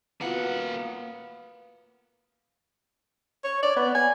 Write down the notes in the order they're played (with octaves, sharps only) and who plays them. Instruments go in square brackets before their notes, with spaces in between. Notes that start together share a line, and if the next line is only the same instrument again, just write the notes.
[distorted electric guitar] A#3 F#5 [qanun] B3 F4 F#4
[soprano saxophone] C#5
D5
B3
G#5